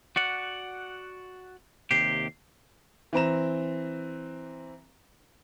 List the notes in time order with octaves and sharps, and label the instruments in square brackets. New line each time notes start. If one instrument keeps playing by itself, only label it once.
[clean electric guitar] F#4 D5 F#5
[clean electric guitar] D#2 C3 G4 [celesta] C7
[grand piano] E3 C4 A#5 E7